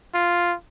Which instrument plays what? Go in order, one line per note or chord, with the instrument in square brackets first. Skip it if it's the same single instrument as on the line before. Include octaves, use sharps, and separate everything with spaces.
[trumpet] F4